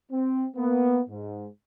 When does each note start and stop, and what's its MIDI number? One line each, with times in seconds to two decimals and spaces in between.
0.12 0.46 60
0.56 1.01 58
0.56 1.01 59
1.09 1.47 44